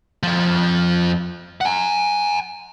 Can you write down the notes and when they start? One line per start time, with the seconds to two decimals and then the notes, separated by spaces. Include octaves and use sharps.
0.23 F2 F3
1.61 F#5 G#5